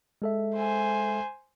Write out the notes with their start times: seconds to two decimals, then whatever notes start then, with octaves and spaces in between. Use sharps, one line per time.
0.22 G#3 A4 E5
0.55 C5 G#5